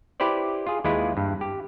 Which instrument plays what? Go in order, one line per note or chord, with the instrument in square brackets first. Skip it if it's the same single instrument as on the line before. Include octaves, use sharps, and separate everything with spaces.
[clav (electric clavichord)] E4 G4 B4 C5 D5
F4 G#4
D#2 G#3 E4 F4 B4
G2
G4